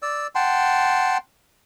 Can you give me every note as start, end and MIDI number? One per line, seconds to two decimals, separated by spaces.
0.02 0.27 74
0.02 0.27 88
0.35 1.17 78
0.35 1.17 79
0.35 1.17 81
0.35 1.17 84